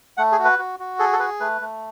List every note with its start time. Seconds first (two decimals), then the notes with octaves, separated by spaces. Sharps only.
0.17 A3 F#5
0.32 G#4
0.39 F#4
0.44 B4
0.59 F#4
0.80 F#4
0.99 G#4 A4
1.13 A4
1.19 G#4 B4
1.40 A3 B4
1.61 A3